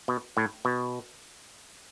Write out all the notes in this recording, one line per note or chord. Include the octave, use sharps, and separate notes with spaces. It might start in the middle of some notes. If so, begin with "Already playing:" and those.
B2
A2
B2